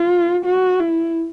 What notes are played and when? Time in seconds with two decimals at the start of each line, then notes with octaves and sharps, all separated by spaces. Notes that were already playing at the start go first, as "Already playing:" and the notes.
Already playing: F4
0.46 F#4
0.80 E4